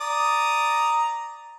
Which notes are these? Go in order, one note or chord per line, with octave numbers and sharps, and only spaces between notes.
D5 A#5 D#6